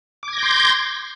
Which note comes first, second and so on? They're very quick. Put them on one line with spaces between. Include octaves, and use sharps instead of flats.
D6 G#6 A#6 G6 C6